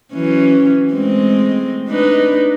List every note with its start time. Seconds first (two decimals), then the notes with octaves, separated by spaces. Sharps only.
0.13 E3 F#3 C#4
0.93 G#3 A3 C4
1.89 D4 D#4 B4